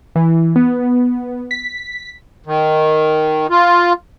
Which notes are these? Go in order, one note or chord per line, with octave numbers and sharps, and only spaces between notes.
E3
B3
B6
D#3
F4